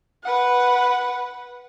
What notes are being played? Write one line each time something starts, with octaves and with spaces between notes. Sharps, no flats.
B4 F#5